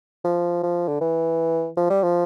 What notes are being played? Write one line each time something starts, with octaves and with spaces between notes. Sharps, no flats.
F3
F3
D3
E3
F3
G3
F3